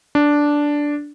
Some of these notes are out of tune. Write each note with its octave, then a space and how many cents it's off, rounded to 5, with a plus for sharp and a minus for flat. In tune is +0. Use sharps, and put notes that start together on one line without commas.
D4 -5